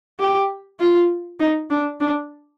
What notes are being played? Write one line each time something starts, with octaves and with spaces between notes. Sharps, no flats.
G4
F4
D#4
D4
D4